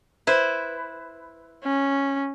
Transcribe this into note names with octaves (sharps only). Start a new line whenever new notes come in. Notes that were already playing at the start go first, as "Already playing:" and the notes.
E4 B4 C5
C#4